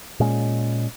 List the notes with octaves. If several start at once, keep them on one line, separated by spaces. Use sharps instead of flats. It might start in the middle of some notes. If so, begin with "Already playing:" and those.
A#2 G#3 C#4